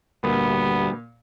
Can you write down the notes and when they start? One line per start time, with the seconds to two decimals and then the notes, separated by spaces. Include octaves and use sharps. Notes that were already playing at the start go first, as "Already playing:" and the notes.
0.24 D2 A#2 G3 B3